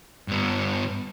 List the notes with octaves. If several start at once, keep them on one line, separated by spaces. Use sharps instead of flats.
G2 B3